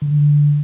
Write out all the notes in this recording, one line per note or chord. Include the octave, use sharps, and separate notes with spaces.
D3